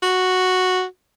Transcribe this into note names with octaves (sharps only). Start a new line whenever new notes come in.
F#4